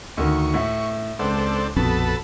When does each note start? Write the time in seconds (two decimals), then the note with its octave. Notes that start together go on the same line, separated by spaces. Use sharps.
0.17 D2 D#3 C#6
0.54 A2 E5
1.19 C#2 C4 D4 A4
1.76 A#1 F2 B2 C4 A4 B4 A5